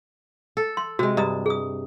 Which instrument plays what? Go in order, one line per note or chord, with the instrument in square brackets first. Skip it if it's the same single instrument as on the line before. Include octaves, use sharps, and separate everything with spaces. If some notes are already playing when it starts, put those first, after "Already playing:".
[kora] A4
[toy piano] C6
[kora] C3 G#3 [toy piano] F#4
[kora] G2 [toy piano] D#5 A#5 D#6
[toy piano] G#4 D#6